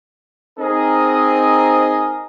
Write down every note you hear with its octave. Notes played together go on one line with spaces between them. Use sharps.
C4 D#4 G#4 A#4 D#5